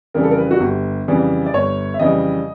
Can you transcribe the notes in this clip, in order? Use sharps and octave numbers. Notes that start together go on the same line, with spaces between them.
F2 C#3 E3 G3 A#4
A4
A#4
B4
F#4
G1 G4
F2 C#3 E3 G3
D5
G1 C#5
E5
F2 C#3 E3 G3 D#5